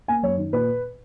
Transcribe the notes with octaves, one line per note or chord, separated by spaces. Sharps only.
A#3 G#5
F#2 C#5
D#3
A#2 B4